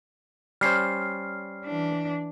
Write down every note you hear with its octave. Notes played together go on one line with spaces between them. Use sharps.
G3 C#4 C5 F6 C7
E3 D4